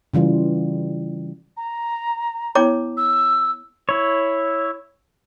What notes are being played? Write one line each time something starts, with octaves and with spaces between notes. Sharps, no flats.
C#3 E3 G3 F4
A#5
B3 E4 C#5 G5 A#5 D6
E6
E4 C#5